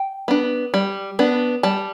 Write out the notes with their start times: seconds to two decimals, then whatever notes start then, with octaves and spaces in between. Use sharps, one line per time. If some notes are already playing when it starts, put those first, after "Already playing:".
Already playing: G5
0.28 B3 D4
0.74 G3
1.19 B3 D4
1.63 G3 A5